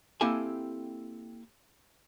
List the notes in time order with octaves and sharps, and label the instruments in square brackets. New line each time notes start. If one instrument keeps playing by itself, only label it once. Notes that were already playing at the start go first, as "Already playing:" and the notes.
[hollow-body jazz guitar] A#3 C4 E4 G4 A4 G#5